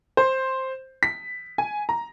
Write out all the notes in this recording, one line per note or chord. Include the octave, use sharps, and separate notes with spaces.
C5
B6
G#5
A#5